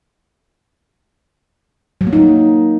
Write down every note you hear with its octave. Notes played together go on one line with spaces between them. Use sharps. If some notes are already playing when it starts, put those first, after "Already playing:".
F#3
A#3
D#4